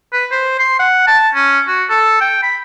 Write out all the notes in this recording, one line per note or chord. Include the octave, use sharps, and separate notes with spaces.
B4
C5
C6
F#5
A5
C#4
F#4
A4
G5
B5